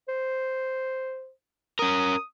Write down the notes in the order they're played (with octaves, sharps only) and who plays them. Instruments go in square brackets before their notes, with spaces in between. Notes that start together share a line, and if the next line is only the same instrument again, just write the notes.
[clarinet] C5
[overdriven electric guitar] C#4 A#4 [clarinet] D#6